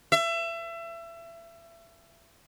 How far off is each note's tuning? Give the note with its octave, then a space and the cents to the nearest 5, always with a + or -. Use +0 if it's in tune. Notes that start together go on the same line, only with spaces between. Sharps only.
E5 +30